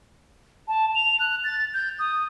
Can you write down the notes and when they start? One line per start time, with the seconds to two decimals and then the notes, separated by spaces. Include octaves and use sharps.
0.68 A5
0.95 F7
1.20 F#6
1.44 A6
1.74 G6
1.99 D#6